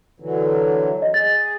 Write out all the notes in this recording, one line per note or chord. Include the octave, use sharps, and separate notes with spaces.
D3 E3 F#3
D#5
G#4 A6